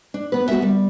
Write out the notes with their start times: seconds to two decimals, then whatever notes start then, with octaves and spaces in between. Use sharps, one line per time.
0.14 D4
0.32 B3 B4
0.49 B3 F#4 A#4 E5
0.62 G3